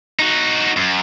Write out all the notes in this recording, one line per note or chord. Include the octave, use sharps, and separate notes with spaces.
D#4 F#4
F#2